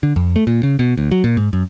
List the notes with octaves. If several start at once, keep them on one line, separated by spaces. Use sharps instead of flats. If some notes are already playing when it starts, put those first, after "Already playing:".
D3
F2
A3
A#2
C#3
B2
D2
F#3
A#2
G#2
F#2